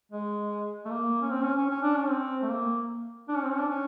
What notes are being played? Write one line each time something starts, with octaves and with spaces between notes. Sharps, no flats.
G#3
A3
A#3
C#4
C4
C#4
C#4
C#4
D4
C#4
C4
A3
A#3
D4
C#4
C4
C#4
D4
C#4